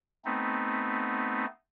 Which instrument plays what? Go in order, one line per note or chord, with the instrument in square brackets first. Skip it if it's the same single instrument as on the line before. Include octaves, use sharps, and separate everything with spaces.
[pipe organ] A3 B3 C4 D#4